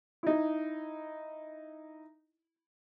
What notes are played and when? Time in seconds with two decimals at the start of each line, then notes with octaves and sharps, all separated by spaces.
0.23 D#4 E4